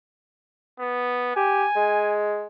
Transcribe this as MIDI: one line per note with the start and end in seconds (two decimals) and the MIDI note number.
0.80 1.35 59
1.36 1.65 67
1.36 2.17 80
1.76 2.46 56